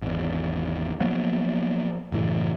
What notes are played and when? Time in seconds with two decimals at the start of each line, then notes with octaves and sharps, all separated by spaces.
0.02 G#1 E2
1.00 F3 F#3 A#3 B3
2.12 F#1 A2 E3